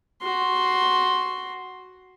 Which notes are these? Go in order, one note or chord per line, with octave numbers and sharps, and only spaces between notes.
F#4 C6